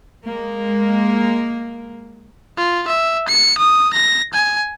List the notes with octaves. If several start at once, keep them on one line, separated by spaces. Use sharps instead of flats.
G#3 A#3
F4
E5
C#7
D#6
A#6
G#5